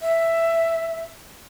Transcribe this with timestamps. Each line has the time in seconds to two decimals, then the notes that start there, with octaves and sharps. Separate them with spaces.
0.02 E5